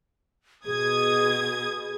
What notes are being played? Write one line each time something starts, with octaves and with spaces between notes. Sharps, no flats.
B2 G#4 D#6 G#6